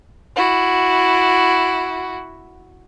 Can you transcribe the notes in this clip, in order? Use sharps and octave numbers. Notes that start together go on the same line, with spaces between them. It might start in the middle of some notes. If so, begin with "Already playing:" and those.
E4 F#4